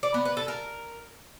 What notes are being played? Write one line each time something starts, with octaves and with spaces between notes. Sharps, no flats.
D5
B3
B4
A4
A#4